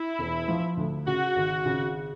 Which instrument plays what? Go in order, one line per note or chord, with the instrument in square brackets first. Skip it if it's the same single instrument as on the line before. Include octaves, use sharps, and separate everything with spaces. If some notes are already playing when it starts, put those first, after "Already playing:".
Already playing: [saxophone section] E4
[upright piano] E1
F3
D2
[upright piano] C#3 [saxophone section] F#4
[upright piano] G#1
C#3